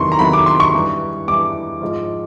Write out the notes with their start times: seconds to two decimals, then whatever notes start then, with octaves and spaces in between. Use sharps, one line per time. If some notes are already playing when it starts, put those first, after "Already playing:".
Already playing: E2 C3 D#3 F#3 C6 C#6
0.12 A#5
0.19 E2 C3 D#3 F#3 B5
0.33 D6
0.46 C6
0.60 C#6
0.74 G2 E3
1.28 G2 E3 D6
1.81 G#2 F3